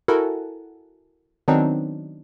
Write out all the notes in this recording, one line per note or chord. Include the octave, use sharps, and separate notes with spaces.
E4 F#4 A4 A#4 F#5 G#5
D#3 F#3 B3 C4 D4 D#4